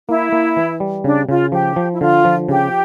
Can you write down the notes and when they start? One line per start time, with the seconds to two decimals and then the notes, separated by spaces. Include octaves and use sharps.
0.09 A#3 E4
0.32 A#3
0.57 E3
0.80 G3
1.04 C#3 D4
1.29 C#3 F4
1.52 F3 G4
1.76 F3
1.94 E4
2.00 D3 F4
2.25 F3
2.49 C#3 G4